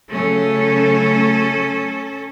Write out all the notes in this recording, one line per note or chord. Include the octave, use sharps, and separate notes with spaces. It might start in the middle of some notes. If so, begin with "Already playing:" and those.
C#3 F#3 A3 C#4 A4